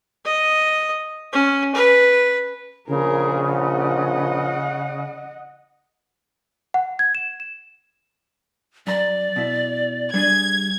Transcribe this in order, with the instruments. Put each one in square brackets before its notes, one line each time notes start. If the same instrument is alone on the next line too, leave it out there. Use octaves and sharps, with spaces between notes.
[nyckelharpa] D#5
C#4
B4
[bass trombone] A#1 [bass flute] C#3 [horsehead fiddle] G#4 A#4
[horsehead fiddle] D#5 F#5
[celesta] F#5
G#6
E7
E7
[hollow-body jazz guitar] F#2 A#5 [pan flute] D5
[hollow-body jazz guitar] B2 E4
[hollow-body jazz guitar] G3 D4 G#4 [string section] G#6